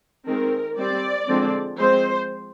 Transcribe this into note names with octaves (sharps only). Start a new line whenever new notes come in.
D#3 G#3 C4 A#4
G3 C4 D5
D3 F3 G#3 C4
F3 G#3 C4 C5